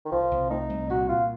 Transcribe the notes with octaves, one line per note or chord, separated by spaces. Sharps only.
D#3
C2 F3
C2
A3 D#4
C2
A#2 F#4
A#2 F4